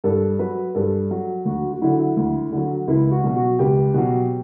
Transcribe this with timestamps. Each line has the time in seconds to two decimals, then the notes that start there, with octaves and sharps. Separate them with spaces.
0.04 G2 A4
0.39 F#3 B4
0.75 G2 A4
1.11 F#3
1.45 D2 F#4
1.73 F#4
1.81 D3 F#3 E4
2.17 D2
2.52 D3 F#3
2.88 C#2 E4
3.11 F#4
3.24 B2 F#3
3.36 F#4
3.59 C#2 G4
3.94 B2 F#3